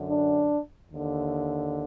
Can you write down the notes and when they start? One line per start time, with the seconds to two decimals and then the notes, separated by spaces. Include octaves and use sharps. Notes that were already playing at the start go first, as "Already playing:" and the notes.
Already playing: F#2 D3
0.08 D4
0.91 D#2 D3